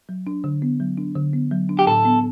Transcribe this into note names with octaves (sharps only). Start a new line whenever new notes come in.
F#3
D4
D3
B3
F#3
D4
D3
B3
F#3
D4
G4
A2 A4
B3